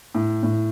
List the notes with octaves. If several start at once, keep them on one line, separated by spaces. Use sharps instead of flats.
A2
A2